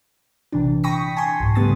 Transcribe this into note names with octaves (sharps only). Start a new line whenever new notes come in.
A#1 C3 E3 D4
G5 B5 C#6 D#6 A#6 B6
G#5 A5 C6 C#6
C2 G#2
C#3 G3 A3 B3 D#6 A6